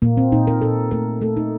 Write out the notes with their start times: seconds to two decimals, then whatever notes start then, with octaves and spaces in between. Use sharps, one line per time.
0.02 A#2 A#3
0.17 C4
0.32 A#2 D#4
0.47 A#4
0.61 A#2 A4
0.91 A3 A#4
1.21 A3 A4
1.37 D#4